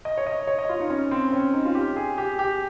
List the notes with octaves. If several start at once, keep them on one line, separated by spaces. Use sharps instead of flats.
D#5
C#5
D#5
C#5
D#5
F4
D#4
C#4
C4
C#4
D#4
F4
G4
G#4
G4
G4